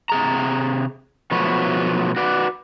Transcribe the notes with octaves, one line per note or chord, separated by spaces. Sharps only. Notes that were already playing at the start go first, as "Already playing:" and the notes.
C3 G#4 A#5
B2 F3 F#3 A3 B4 C#5
F#4 B4 D5